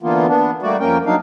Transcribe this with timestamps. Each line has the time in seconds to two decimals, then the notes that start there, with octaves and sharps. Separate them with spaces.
0.03 D3 E3 A#3 B3 F4
0.28 B3 D4
0.62 G3 A3 A#3 F#4 D5
0.80 F2 A#3 C#4 A#4 G5
1.06 F#3 D4 D#4 F5